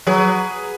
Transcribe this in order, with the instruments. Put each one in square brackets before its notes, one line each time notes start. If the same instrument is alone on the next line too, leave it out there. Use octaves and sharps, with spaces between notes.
[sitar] F#3 [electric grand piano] G#4 B4